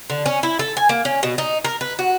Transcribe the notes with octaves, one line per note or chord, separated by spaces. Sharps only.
D3
C#4
E4
A4
G#5
A#3
C#4
B2
D#4
A#4
B4
F#4